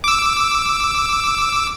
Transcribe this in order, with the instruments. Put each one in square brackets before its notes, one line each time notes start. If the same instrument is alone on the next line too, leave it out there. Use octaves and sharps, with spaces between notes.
[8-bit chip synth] D6 E6